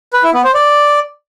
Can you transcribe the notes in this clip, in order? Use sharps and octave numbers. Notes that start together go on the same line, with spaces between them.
B4
E4
B3
C5
D5